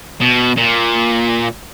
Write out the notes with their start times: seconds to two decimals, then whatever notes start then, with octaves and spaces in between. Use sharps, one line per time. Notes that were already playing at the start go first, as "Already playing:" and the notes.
0.21 B2
0.57 A#2